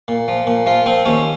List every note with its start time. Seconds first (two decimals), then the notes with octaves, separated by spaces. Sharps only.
0.08 A#2
0.28 F3
0.47 A#2
0.66 F3 F4
0.86 F3 C4
1.05 D#2 C#4